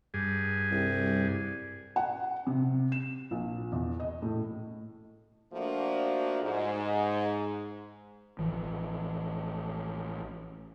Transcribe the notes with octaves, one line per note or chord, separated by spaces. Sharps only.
G2 G#4
C2
F#5
C3
E7
A#1
E2
D#5
A2
F3 A3 A#3 D4 F#4
G#2
A1 E3 F3